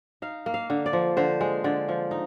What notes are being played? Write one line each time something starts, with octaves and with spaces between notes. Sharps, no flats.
D#4 F5
A#3
F5
D3
D5
F3
D3 C5
G#3
D3 D5
F3
D#4